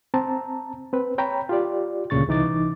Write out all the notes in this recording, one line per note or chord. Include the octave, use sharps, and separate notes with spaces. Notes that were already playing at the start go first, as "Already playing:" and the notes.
C4 A5 A#5
C4 B4
C#5 G5 A#5 B5
F4 G4 D5
D2 A#2 C#3 C#6 A6
C2 E3 D#4 D6 A6